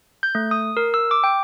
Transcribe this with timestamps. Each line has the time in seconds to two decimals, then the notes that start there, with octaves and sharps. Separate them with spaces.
0.23 G6
0.35 A3
0.51 D#6
0.77 A#4
0.94 E6
1.11 D6
1.24 G5